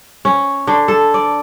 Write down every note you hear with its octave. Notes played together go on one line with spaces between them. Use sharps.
C#4
D3
A4
D5